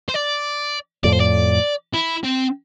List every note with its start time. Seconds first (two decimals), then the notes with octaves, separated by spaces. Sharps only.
0.09 C5
0.14 D5
1.04 F2 A2 D5
1.13 C5
1.20 D5
1.94 E4
2.24 C4